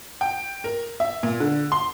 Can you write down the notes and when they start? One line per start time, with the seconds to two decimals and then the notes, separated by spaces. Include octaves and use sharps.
0.21 G5
0.64 A#4
1.00 E5
1.23 A#2
1.40 D3
1.72 C6